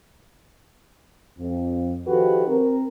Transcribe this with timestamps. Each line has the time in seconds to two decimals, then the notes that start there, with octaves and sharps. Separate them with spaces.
1.38 F2
2.06 D#3 F3 F#4 G4 A4 B4
2.46 C4 A#4